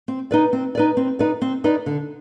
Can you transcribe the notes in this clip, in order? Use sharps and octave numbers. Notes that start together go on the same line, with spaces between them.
C4
D#4 B4 D5
C4
D#4 B4 D5
C4
D#4 B4 D5
C4
D#4 B4 D5
D3